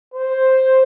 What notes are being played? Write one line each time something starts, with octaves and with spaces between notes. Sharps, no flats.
C5